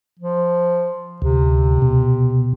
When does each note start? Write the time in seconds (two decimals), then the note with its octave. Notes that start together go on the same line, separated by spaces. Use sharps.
0.20 F3
1.22 D2 C3
1.82 B2